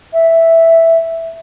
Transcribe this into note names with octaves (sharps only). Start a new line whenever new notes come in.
E5